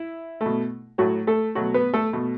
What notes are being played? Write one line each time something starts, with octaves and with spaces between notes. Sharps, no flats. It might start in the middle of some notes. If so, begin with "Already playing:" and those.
Already playing: E4
A3
B2
A2 F#3 A3 F#4
A3 A4
B2 F#3 A3 F#4
B3 B4
A3 A4
B2 A3